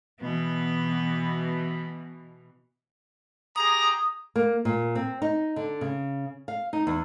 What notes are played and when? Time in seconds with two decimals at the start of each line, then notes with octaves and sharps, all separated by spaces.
0.21 B2 E3 B3
3.56 G4 G#4 A#5 D#6
4.36 A#3
4.65 A#2
4.95 C4
5.22 D#4
5.56 D3
5.81 C#3
6.48 F5
6.73 D#4
6.87 E2